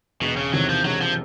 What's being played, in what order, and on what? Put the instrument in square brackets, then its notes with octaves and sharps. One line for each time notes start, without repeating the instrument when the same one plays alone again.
[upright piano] E1 [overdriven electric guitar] B2
[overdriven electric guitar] C#3
[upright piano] E2 C3 D#3 [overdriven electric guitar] F#3
[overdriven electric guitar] F3
[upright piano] E1 [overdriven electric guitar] F#3
[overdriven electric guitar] F3